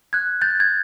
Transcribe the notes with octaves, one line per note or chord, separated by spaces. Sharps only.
F#6 G#6
G6 A6
G#6